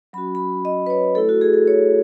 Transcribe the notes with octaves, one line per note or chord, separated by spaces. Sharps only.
F#3 C#4 F#4 B5
B5
D#5
B4
C#5
A3 E4 A4
F#4
G#4
A4
C#5